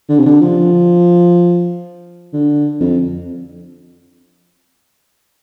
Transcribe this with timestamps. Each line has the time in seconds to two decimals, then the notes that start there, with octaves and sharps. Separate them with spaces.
0.09 D3
0.19 C3
0.26 D3
0.41 F3
2.33 D3
2.80 F2